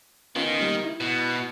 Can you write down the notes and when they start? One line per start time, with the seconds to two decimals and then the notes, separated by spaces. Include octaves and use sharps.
0.36 D#3 B3 C#4 F4
0.59 B2 G3 A#3
0.84 E4
1.00 B2